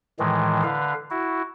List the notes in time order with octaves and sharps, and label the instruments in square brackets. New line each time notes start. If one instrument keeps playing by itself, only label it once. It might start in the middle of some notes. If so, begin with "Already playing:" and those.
[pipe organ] A2 D#3 E3 G#3
D3 B4 F5
E4 F#4